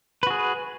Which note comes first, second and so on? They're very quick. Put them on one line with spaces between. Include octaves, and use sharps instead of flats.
B4 F#4 G#4